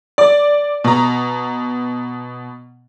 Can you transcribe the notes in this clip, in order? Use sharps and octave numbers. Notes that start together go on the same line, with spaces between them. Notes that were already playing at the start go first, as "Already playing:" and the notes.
D5
B2 A#5